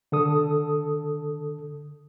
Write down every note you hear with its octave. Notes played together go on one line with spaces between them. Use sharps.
D3 A4 D#6